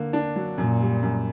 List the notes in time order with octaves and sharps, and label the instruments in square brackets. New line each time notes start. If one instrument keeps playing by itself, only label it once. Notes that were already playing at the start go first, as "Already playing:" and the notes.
Already playing: [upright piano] D3 A#3
D4
F#3
[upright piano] F#2 [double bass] A#2
[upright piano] G3
F#2